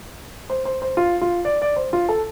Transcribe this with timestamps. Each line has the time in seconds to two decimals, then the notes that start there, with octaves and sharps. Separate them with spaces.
0.50 C5
0.65 C5
0.82 C5
0.97 F4
1.21 F4
1.45 D5
1.62 D5
1.76 C5
1.93 F4
2.09 A4